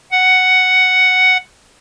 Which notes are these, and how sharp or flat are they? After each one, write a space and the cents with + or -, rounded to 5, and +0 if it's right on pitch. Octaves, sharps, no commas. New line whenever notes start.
F#5 +5